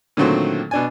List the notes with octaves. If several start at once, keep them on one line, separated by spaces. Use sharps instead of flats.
A#2 D3 D#3 F#3 A3 C4
B2 D4 G#5